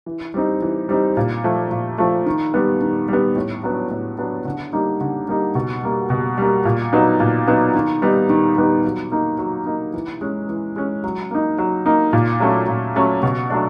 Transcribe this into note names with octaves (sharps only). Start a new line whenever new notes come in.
E3
G3 C4 D#4
E3
G3 C4 D#4
A#2
F3 A3
A#2
F3 A3
D#3
G3 B3
D#3
G3 B3
A2
F#3 B3 D4
A2
F#3 B3 D4
D3
G3 A#3 D#4
D3
G3 A#3 D#4
B2
G3 A#3
B2
G3 A#3
A#2
F#3 B3 D#4
A#2
F#3 B3 D#4
D#3
G3 B3 D#4
D#3
G3 B3 D#4
F#3
A#3 D#4
F#3
A#3 D#4
E3
G#3 C#4
E3
G#3 C#4
F#3
A#3 D#4
F#3
A#3 D#4
A#2
F#3 A3 C#4
A#2
F#3 A3 C#4
B2
F#3 A3 D4